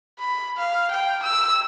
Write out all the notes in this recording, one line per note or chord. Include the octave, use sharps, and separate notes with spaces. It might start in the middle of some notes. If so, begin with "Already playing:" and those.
B5
F5
G5
E6